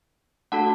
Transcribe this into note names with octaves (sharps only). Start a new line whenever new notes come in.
A3 D4 F#4 A4 F#5 A5